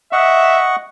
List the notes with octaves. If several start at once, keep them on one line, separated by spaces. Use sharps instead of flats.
D#5 E5 F#5 C#6